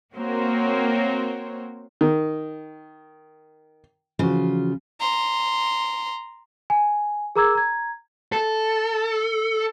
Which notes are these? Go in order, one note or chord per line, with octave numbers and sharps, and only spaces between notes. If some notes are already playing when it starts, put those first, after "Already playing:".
A#3 C4 F#4 A#4 C5 C#5
D#3
C#3 E3 F3 F4 F#4
A#5 C6
G#5
G#4 A#4 A#5 D6 E6 G#6
A#5 G#6
A4